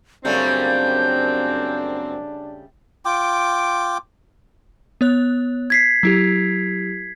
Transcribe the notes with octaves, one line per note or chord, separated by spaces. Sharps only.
F#2 C#3 G3 A3 A#3 C4 D4 G6
F4 G5 D6
B3 C#5 F#6
G#6 B6 C7
F#3 E4 G4